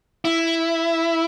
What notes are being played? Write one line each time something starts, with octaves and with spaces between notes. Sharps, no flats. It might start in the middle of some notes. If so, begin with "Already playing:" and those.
E4